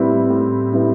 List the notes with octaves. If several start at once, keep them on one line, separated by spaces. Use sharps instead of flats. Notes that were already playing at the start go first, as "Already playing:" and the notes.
Already playing: A2 G3 C4 E4 B4
A2
G3 C4 E4 B4